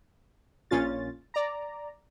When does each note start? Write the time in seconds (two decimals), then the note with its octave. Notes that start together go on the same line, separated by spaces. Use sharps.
0.71 A#1 A#2 C#4 F4 A6
1.34 D5 A#5